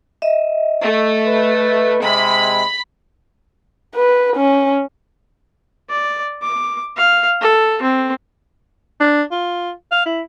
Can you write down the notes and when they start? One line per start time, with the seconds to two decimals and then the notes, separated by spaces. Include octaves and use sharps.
0.22 D#5 E5
0.81 A3
1.26 B4
2.02 C3 G#3 B5
3.96 B4
4.36 C#4
5.90 D5
6.42 D6
6.97 F5
7.41 A4
7.82 C4
9.01 D4
9.31 F4
9.92 F5
10.06 E4